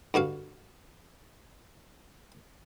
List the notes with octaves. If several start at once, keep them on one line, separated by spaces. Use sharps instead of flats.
G2 D3 F#4 F5